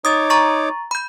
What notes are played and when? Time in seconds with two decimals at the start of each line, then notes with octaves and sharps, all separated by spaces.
0.05 D#4 C#5 D6 D#6 A6
0.30 A#5 C#6 A6
0.91 B5 G6